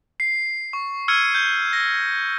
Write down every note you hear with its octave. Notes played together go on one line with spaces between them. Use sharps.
C7
C#6
E6 F6 G#6 C#7 D#7
G6
A#6